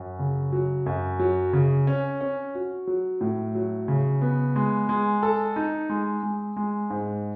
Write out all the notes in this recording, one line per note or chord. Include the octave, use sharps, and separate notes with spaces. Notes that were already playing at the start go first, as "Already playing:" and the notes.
Already playing: F#2
C#3
F#3
F#2
F#3
C#3
C#4
C#4
F#4
F#3
A2
F#3
C#3
B3
G#3
G#3
A4
D#4
G#3
G#3
G#3
G#2